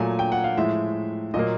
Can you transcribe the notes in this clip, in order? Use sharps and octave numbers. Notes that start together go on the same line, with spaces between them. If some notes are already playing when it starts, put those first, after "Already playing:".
Already playing: A#2 F#3 A3 G#5
G5
F#5
F5
A2 F3 G#3 E5
A#2 F#3 A#3 D#5